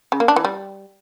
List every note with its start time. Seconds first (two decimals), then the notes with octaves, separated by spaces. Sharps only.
0.12 C#3
0.20 A#3
0.28 D4
0.36 E3
0.45 G3